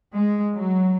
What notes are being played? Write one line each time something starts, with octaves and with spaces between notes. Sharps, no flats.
G#3
F#3